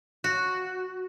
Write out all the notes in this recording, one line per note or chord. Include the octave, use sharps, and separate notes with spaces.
F#4